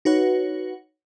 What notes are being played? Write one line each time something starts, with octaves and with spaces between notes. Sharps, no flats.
D#4 F#4 B4 C#5 F#5